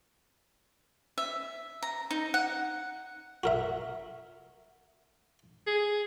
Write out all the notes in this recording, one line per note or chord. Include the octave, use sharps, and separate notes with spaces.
E5
A#5
D#4
F#5
F#4 A#4 E5
G#4